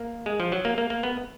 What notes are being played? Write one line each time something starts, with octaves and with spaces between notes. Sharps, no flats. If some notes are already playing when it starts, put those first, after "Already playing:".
Already playing: A#3
G#3
F3
F#3
A#3
A#3
A#3
B3